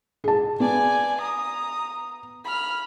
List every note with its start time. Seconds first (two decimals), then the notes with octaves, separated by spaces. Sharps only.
0.24 G#4 A5
0.60 B3 D5 G#5
1.22 A#5 D#6
2.45 B5 F6